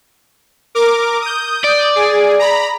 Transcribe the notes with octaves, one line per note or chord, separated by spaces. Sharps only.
A#4 D6
D#6 G6
D5
G#4
A#5 B5